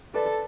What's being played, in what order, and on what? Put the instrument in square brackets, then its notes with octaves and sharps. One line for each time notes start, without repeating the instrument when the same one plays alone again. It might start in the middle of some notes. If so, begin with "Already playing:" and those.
[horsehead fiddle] A4 [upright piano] B4 D5